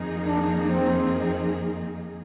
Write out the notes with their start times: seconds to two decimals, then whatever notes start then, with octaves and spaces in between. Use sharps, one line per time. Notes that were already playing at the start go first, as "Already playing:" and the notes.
Already playing: F2 D#3 A#3 D#4 G#4
0.27 D4
0.70 C4